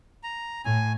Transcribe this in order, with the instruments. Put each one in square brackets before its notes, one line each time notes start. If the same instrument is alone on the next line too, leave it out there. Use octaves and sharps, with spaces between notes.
[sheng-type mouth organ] A#5
[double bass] A2 [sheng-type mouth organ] G#5